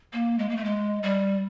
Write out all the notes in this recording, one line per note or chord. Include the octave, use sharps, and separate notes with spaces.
A#3
G#3
A#3
A3
G#3
G3